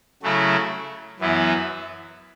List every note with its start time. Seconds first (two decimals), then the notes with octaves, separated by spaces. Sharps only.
0.23 C#3 F#3 A3 C#4 E4
1.19 F#2 E3 B3 E4